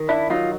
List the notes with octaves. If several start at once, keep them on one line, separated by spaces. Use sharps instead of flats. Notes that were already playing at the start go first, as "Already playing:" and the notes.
Already playing: D#3
D4 E4
F#3 D#4 F4